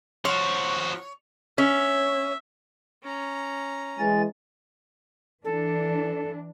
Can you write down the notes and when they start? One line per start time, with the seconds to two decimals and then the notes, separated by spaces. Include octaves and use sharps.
0.25 F3 F#4 C#5
1.58 C#4 E5
3.03 C#4 A#5
3.99 E3 G#3 G#5 A6
5.44 E3 D4 A4